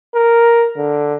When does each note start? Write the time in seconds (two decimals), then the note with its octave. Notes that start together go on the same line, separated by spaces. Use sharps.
0.15 A#4
0.77 D3